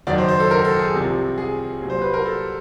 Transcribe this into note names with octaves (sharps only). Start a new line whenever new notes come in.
F#1 F#2 D#3 F#3 D5
C5
C5
A4
A#4
A4
G#4
C2 C3 F3
G#4
C2 A#2 F#3
C5
B4
A#4
A4